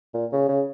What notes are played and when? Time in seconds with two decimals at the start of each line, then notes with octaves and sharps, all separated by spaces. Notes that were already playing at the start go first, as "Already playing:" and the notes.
0.14 A#2
0.32 C#3
0.49 C#3